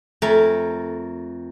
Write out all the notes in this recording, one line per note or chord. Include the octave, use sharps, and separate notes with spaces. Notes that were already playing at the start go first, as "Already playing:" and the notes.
F2 A3 A#4 G#5 A#5